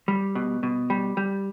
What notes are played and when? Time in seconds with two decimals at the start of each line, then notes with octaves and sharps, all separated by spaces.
0.08 G3
0.35 B2
0.63 B2
0.90 G3
1.17 G3